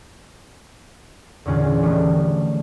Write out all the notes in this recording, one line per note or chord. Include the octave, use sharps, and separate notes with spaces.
E2 A#2 D3 C#4 F4 G#4
D#3 F3 G3 A3 D4